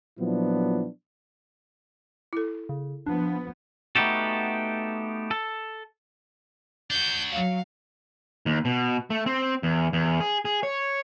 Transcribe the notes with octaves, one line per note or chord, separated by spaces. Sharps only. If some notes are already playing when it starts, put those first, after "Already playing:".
A#2 F3 F#3 B3 D4 E4
E4 A4
C#3
F3 B3 D4
A3 B3 D#4 F#4 G4 A4
A4
D4 F#4 G6
F#3 F5
D#2
B2
A3
C4
E2
E2
G#4
G#4
C#5